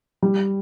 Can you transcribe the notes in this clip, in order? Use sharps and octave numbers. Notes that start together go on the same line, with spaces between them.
G3